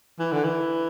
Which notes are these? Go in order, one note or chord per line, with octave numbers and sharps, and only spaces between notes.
E3
D3
E3